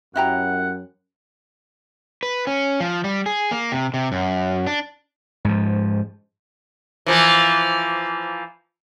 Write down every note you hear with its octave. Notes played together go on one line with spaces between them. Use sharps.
F#2 E4 G4 F#5 A#5
B4
C#4
F3
G3
G#4
A#3
C3
C3
F#2
D4
G#2 F3
E3 F3 A#3